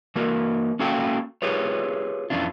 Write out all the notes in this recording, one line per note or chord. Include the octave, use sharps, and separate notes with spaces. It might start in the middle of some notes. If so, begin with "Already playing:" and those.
E3 A#3 F#4 A#4
A#3 C#4 F#4 A4 F5 G5
F4 G4 G#4 B4 C#5
F2 E3 C#4 D4 F4